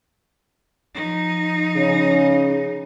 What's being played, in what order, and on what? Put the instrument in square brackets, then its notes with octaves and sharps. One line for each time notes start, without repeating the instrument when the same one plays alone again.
[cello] F3 D#4
[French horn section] C#3